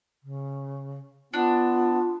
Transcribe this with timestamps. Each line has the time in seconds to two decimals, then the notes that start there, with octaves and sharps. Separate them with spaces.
0.23 C#3
1.33 B3 D4 F4